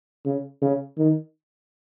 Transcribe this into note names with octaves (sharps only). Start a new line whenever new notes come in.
C#3
C#3
D#3